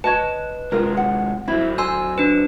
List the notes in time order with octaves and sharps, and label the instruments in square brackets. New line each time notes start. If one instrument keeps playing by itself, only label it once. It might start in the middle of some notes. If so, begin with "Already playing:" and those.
[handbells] B4 [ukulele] C#5 D#5 A5
[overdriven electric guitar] C3 G#3 [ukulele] F4 A#4
[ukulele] F#5
[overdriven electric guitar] F#3 C4 [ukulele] E4
[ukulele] C5 [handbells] G#5 E6
[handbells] D4 B4